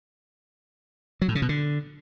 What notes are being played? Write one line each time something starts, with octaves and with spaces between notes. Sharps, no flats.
F#3
A2
C#3
B2
D3